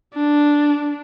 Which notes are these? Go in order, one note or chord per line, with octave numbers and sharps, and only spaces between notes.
D4